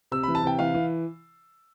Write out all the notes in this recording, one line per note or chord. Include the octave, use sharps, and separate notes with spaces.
C3 E6
E3 B5
A5
C3 G5
E3 F5
E3